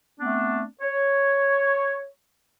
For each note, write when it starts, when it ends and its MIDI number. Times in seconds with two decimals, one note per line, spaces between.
0.20 0.63 57
0.20 0.63 59
0.20 0.63 60
0.20 0.63 62
0.81 2.07 73